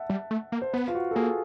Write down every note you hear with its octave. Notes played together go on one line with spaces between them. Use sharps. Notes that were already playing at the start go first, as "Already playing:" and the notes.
Already playing: E5 F#5 A5
G3
A3
A#3
C5
B3 B4
F4
F#4
A4
A#3 G#4